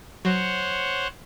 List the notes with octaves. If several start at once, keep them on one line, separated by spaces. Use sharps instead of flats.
F#3 C5 C#5 F#5